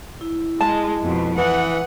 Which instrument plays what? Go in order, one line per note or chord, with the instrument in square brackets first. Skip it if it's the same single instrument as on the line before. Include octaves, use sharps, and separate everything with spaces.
[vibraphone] E4
[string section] G#3 [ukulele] A5
[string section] F2 B2
[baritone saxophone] E3 [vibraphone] B4 D#6 [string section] F#5